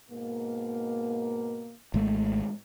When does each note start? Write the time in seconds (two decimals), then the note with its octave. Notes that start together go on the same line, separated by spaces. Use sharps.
0.10 G#2 B2 A#3
1.94 G#1 G#3 A3